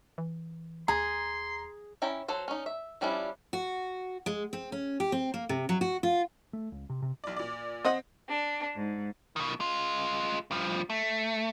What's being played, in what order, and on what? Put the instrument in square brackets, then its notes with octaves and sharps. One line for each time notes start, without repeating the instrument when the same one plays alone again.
[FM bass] E3
[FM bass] D#2 [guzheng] G#4 [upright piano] A#5 [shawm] C6
[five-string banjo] C#4 E4 G5 A#5
F#3 A4 C5
C#4 D#4
E5
F3 G3 C#4 D4 E4
[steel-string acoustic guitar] F#4
G#3
C4
C#4
G4
C4
A#3
C3
F#3
F#4
F4
[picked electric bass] A3
C#2
C3
C3
[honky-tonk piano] B1 D5
A#2 D5
[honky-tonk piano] C4 [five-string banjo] C5 D#5 F#5
[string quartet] D4
G#2
[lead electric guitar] B2 D#3
G#3 F4
G2 F3
A3